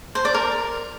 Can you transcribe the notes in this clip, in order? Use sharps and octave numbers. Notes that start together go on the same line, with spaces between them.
C5
D5
A#4